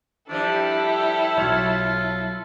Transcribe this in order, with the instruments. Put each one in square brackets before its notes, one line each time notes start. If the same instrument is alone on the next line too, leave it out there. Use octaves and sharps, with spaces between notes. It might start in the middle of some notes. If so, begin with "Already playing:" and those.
[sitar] G2 F3 G3 [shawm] D4 [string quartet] E4 A4
[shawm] G4
[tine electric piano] B1 B2 F#3 [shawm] F4 [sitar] C#5